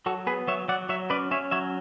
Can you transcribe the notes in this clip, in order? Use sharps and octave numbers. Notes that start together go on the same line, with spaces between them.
F#3 F#4 A4
B3 G#4 B4
F#3 C#5 E5
F#3 D5 F#5
F#3 C#5 E5
C#4 B4 D5
C#4 C#5 E5
F#3 C#5 E5